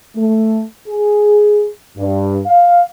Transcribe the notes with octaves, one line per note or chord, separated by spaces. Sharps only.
A3
G#4
G2
F5